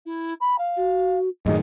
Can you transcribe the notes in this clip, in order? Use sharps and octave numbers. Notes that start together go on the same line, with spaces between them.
E4
B5
F5
F#4
F#2 A2 D#3 G#4 D#5